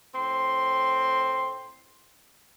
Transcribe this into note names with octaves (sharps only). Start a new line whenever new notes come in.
A2 C4 C6